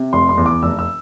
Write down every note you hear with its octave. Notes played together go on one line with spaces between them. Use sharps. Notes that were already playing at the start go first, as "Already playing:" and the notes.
Already playing: C3
F1 C6
C6
E2
D6
F1 E6
E6